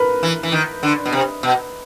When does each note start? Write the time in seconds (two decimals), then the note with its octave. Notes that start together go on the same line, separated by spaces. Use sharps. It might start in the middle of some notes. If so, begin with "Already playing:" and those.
Already playing: A#4 B4
0.23 E3
0.43 E3
0.52 D#3
0.83 D3
1.06 B2
1.12 C3
1.43 B2